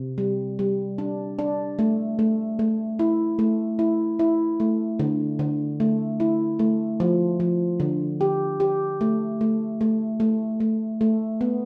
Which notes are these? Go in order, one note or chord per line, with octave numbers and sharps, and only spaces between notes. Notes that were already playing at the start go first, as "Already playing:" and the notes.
Already playing: C3
G3
G3
D4
D4
A3
A3
A3
E4
A3
E4
E4
A3
D3
D3
A3
E4
A3
F3
F3
D3
G4
G4
A3
A3
A3
A3
A3
A3
B3